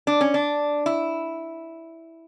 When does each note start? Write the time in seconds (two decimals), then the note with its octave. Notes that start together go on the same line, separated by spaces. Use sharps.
0.07 D4
0.21 C#4
0.34 D4
0.86 E4